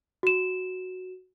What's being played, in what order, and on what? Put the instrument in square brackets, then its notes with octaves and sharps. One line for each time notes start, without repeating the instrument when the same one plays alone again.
[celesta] F#4 E7